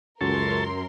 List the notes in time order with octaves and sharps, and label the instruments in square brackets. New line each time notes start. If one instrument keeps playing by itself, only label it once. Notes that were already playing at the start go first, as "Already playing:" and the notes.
[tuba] C#2 [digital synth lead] F#2 [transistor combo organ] A4 C#5 A5 [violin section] A#4 C6